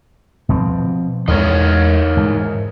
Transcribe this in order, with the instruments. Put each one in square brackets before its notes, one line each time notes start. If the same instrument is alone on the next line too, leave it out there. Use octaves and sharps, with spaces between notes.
[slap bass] B2 F3 C4
[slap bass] E2 G#3 [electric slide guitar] D#4 A#4 C#5
[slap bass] G#2 E3